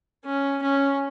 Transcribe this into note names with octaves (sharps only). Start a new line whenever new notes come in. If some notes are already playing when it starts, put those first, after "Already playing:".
C#4
C#4